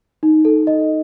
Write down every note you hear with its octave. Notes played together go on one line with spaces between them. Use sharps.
D#4
A4
D#5